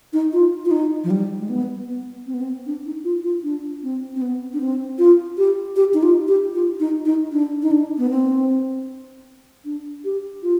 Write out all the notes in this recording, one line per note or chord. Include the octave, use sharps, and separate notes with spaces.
D#4
F4
F4
D#4
F3
G3
G#3
B3
B3
C4
B3
C4
D4
D#4
F4
F4
D4
C4
C4
B3
D4
C4
F4
G4
G4
D#4
F4
G4
F4
D#4
D#4
D4
D#4
D4
B3
C4
D4
G4
F4